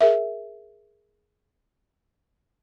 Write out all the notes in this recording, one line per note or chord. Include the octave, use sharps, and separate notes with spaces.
G#4 A#4 E5